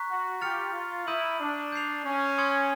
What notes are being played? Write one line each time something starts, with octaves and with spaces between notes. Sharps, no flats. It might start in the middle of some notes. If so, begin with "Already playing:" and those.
Already playing: A#5 C#6 F#6 B6
F#4
F4 G4 F6 A6 C#7 F7
F4
E4 D#6 G6 A#6 D#7 F#7
D4
G6 C7 F7
C#4
C6 D#6 G#6 C#7